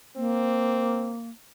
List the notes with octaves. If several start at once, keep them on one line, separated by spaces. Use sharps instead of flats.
A#3 C4